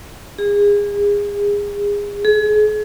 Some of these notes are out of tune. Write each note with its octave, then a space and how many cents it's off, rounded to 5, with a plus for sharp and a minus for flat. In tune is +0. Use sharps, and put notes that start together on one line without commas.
G#4 -30
G#4 +35